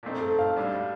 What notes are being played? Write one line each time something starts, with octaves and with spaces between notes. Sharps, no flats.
A#2 A3 C4 D#4
A4
F5
A2 G3 D4